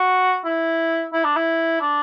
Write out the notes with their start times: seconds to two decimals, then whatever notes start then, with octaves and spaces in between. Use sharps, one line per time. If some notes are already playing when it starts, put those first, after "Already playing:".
Already playing: F#4
0.45 E4
1.13 E4
1.24 D4
1.36 E4
1.81 D4